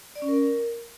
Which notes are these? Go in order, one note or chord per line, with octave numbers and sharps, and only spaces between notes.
D5
C#4
A#4